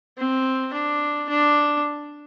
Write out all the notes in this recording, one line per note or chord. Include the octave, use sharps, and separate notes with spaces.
C4
D4
D4